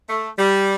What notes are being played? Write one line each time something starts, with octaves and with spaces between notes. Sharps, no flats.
A3
G3